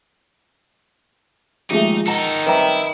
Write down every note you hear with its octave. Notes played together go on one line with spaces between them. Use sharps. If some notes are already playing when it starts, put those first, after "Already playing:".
D#2 F3 G#3 A3 D#4
D#3 D#4 A4 F#5 A5 A#5
F#2 G3 C4 E4 B4 E5 A#5